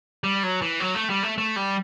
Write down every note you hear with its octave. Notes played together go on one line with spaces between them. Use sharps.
G3
F#3
E3
F#3
A3
G3
A3
A3
G3